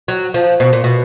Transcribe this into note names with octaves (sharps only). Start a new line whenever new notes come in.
F#3
F3
B2
A#2
B2